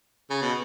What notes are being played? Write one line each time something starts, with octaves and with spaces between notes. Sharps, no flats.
C#3
B2